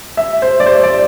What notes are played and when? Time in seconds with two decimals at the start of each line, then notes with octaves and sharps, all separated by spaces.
0.17 E5
0.42 C5
0.60 D5
0.66 C5
0.83 D5